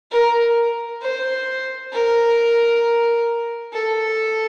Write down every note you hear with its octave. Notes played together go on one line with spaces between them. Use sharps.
A#4
C5
A#4
A4